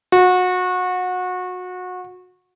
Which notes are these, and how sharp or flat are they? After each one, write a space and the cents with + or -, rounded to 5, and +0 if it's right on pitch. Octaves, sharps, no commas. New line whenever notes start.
F#4 -25